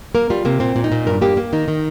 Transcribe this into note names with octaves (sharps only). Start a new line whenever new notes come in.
A#3 A#4
G3 F4
C3 A#3
A#2 C4
A#2
D#4
A#2
G2 A#4
A#3 G4
A#3
D#3 D#4
D#3